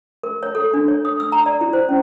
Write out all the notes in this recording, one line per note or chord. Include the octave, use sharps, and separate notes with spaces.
A#4
C#5
A4
D4
C#5
D#6
E6
A#5
D5
E4
C5
C#4